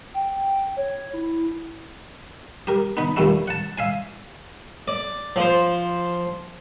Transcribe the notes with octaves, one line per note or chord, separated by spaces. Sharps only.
G5
C#5
E4
G4 A#4
B3 D#4 B5
D#2 A#2 D3 G3 A3
F#5 A5
E5 F5 G#5
D5
F3 C5